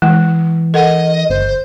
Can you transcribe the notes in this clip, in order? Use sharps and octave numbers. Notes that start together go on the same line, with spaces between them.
E3 G#3
A4 A#4 D#5 F#5
G1 C5